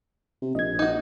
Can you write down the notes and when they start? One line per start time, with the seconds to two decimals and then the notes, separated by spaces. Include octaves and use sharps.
0.42 C3
0.55 A#1 D#5 G#6
0.79 D#4 F#4